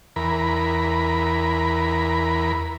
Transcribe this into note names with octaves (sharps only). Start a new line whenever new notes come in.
E2 A#4 B5